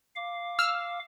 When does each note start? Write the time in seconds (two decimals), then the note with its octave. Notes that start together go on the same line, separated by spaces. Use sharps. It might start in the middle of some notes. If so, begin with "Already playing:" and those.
0.16 F5 D6
0.59 E6 F6